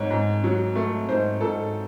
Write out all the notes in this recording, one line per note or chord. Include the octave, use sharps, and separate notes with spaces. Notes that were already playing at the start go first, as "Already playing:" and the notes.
Already playing: G#2 C#5
G#2
F#3
A3
G#2 C5
G#2 A4